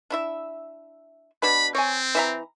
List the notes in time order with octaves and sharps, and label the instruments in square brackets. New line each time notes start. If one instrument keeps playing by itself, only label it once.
[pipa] D4 E4 E5
[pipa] B2 D4 B4 [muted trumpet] B5
[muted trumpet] C4 [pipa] C#5 G#5
[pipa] E3 E5 A#5